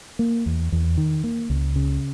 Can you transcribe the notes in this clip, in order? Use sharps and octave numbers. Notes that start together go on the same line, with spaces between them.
A#3
E2
E2
D#3
A#3
C#2
C#3